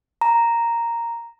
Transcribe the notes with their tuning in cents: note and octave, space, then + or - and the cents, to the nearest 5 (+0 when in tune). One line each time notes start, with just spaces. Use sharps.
A#5 -5